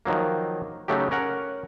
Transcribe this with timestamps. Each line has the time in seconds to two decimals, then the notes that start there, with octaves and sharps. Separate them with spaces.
0.06 D#3 F3 F#3 A#3
0.88 C#3 F#3 A3 D#4 G4
1.11 C#4 A#4 F#5